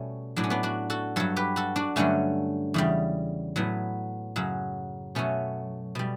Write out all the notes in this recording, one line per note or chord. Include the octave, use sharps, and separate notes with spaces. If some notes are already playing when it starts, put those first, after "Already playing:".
Already playing: B2 G3 A3 C#4
A2 F#3 D4
C#4
B3 D4
D4 F#4
F#4 A4
G2 F#3 A4 C#5
G4 B4
F#4 A4
D4 F#4
G2 D3 F#3 A3 C#4
E2 C#3 G3
A2 F#3 B3
F#2 C#3 F#3
B2 F#3 A3 C#4
B2 G3